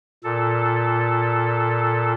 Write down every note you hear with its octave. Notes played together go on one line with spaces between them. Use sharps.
A#2 A4